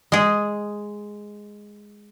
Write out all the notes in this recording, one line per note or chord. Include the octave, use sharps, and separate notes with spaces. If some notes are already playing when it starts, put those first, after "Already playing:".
G#3 G#4